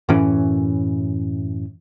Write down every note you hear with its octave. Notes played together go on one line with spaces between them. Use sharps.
F#2 A2 E3 C#4